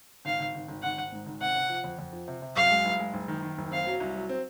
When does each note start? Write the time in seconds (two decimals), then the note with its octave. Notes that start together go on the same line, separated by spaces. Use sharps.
0.25 G#1 F5
0.40 G#1
0.55 G#1
0.68 G#1
0.83 G#1 F#5
0.97 G#1
1.12 G#2
1.26 G#1
1.41 C3 F#5
1.55 C3
1.70 F3
1.84 F2
1.99 F2
2.13 F3
2.28 C3
2.42 C3
2.56 F#2 F5
2.71 G#3
2.85 F#1
2.99 G#3
3.14 F#1
3.28 D#3
3.42 D#3
3.58 F#1
3.71 C4 F5
3.87 F#3
4.00 C2
4.15 F#3
4.29 C4